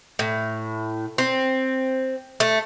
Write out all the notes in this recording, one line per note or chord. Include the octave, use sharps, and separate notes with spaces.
A2
C4
A3